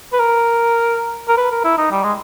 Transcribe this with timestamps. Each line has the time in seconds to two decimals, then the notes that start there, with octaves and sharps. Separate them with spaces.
0.13 B4
0.19 A#4
1.28 A#4
1.38 B4
1.51 A#4
1.64 E4
1.78 D#4
1.91 G3
2.03 G#3